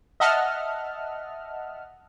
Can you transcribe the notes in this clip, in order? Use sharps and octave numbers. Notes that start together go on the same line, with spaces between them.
D#5 E5 F#5 A5 F6